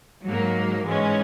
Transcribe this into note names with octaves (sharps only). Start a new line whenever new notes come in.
G#2 F#3 A#3
G#2 E3 G#3 C#4